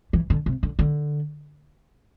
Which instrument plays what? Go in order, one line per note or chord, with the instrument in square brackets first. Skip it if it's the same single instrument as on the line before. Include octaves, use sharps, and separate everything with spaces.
[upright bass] E3
D3
C3
D3
D3